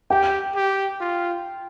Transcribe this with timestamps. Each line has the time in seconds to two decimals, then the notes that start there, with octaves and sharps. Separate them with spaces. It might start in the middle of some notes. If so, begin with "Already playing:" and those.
0.10 G4 G5
0.55 G4
1.01 F4